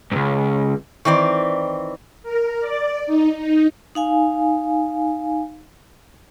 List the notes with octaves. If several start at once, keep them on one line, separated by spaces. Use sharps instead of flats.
C#2 G2
D#3 E3 C4 D5
A#4
D5
D#4
D#4
D#4 F5 G#5